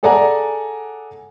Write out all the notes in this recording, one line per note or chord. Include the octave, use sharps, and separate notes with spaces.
G#4 A4 D5 F#5 G#5 A#5